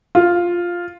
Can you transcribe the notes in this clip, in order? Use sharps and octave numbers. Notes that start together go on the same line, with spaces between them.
F4